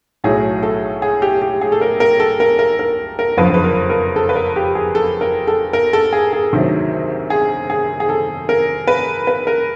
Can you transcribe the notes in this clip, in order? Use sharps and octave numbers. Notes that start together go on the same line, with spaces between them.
B1 A2 F#3 G#4
A4
G#4
G4
G4
G#4
A4
A#4
A#4
A4
A#4
A#4
A#4
A#4
F#1 F2 D3 F3 B4
B4
A#4
A#4
A4
B4
A#4
G4
G#4
A4
A#4
A4
A#4
A4
G#4
G#4
D2 C3 D#3 F#3
G#4
G#4
G#4
A4
A#4
B4
B4
A#4